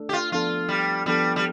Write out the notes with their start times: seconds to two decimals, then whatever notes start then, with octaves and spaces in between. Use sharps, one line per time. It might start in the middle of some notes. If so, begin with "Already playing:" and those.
Already playing: A3 D4 A4
0.09 G4
0.13 F4
0.32 F3 B3 D4 F4 A4
0.69 G3
1.06 F3 G3 B3 D4 A4
1.36 G3